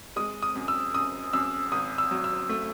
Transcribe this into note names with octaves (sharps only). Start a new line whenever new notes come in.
G#3 D#6
D#6
F#2
E6
F#2 D#6
F#2 E6
G#1 D#6
E6
F#3
E6
A3